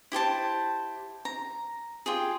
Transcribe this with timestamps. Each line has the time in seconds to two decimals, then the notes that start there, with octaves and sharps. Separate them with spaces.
0.12 E4 G4 C5 A5
1.25 A#5
2.06 F4 G4 G#4